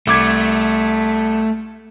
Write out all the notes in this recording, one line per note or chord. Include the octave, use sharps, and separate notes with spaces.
C2 A3 D6 G#6